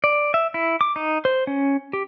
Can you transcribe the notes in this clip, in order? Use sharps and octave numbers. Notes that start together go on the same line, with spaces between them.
D5
E5
E4
D6
D#4
C5
C#4
G4